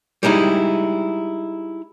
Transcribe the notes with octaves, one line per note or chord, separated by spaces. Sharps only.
G3 G#3 D#4 E4